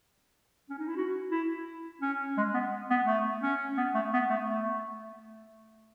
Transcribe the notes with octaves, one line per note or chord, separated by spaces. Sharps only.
C#4
D#4
E4
F#4
E4
C#4
G#3
B3
B3
A3
C#4
B3
A3
B3
A3
A3